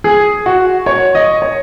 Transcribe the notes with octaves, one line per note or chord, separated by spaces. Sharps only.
G#4
F#4
C#5
D#5
C#5